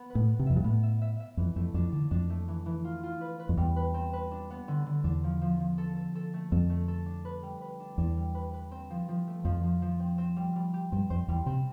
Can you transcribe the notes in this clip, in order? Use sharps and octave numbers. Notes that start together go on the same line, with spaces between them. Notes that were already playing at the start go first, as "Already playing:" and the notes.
Already playing: B3
B4
A2
B3
C3
F2 E5
G2
A2 B3
E5
E5
E5
F2 E3
F2 A3
F2 D4
D3 D4
F2 D4
A3
E3
E3
F4
F4
B4
B4
F2
E2 G3
B4
C4
B4
D4
B3
D3
D3
E2 D4
F3
F3
F3
A4
A4
A4
A3
F2 A4
A3
A4
D4
B4
G3
B4
D4
E2 D4
G3
B4
B4
C4
F3
F3
A3
F2 F3
F3
F3
C4
C4
G3
G3
G4
G2 C4
F2 C5
E2 G3
C3 C4